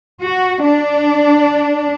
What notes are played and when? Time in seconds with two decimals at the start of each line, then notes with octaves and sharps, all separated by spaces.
0.22 F#4
0.65 D4